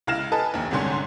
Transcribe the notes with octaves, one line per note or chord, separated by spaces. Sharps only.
C#2 E4 F5 F6 A#6 E7
A4 B4 D#5 G#5 A5
A#1 D#2
G1 C2 G#2 D3 C#4 C6